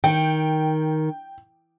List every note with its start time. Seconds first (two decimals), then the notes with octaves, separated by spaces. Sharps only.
0.04 D#3 G5